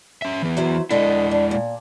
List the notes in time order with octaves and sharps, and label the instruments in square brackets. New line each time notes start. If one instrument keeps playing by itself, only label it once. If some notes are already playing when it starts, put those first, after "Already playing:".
[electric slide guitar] C#4 E5
E3 B3
[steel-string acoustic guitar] F#3 E4 C5
[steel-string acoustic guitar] D3 A4 D#5 [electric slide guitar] G#3 E4
[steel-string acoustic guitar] D4
A#2